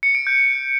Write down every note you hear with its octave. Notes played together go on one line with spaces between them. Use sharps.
C#7
D7
G6